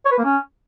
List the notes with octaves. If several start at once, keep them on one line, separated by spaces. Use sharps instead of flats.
C#5
B4
A#3
C#4